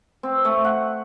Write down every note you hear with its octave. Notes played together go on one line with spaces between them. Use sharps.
C4
A3
F#5